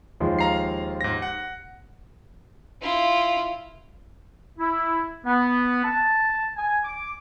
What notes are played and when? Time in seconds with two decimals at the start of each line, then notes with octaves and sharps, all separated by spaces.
0.20 D#2 F3 G#3
0.39 F5 A#5 C7
1.01 G#2 A#6
1.22 F#5
2.81 E4 F4
4.59 E4
5.26 B3
5.84 A5
6.56 G#5
6.84 D6